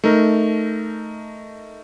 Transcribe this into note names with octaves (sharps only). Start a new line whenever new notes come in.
A3 D#4 A#4